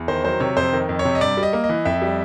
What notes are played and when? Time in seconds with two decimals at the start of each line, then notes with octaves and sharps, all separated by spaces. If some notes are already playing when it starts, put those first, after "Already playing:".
Already playing: E2
0.08 D#3 C5
0.24 F#3 C5
0.40 C3 C#5
0.57 F2 C5
0.73 D#3
0.89 F2
0.99 C#5
1.05 C3
1.15 D#5
1.21 G2 D5
1.37 G3
1.43 D#5
1.53 A#3
1.64 D#5
1.69 E3
1.85 F2 E5
2.02 G3